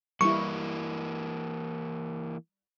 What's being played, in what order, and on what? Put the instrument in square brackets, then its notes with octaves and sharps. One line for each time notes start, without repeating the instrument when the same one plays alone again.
[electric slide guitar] E3 A#3 [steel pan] G3 E4 [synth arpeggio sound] C#6